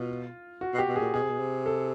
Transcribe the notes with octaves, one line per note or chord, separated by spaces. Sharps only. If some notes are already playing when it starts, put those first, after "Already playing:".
Already playing: B2 F4
F#4
B2
G4
B2
A#2 G#4
B2 G#4
C3
B2
C3
A4